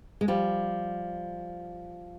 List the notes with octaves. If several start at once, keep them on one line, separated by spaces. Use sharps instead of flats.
G#3
F3 G3